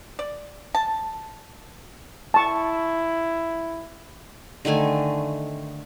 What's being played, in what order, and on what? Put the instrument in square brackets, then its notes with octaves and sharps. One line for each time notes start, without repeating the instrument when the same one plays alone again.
[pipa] D5
A5
[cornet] E4 [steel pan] A5 C#6
[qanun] D3 D#3 A3 G#5